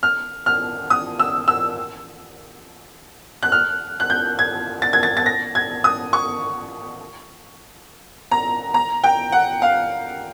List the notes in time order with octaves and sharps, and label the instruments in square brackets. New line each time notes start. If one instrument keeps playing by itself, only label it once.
[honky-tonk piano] F6
F6
D#6
E6
E6
F#6
F6
F#6
G6
G#6
A6
G#6
A6
A6
A#6
G#6
D#6
C#6
A#5
A#5
G5
F#5
F5